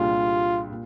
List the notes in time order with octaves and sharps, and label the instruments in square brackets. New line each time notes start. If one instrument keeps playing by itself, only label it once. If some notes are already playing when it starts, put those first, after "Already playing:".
Already playing: [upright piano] C2 A#2 G3 D4 G#4 [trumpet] F4
[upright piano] A#2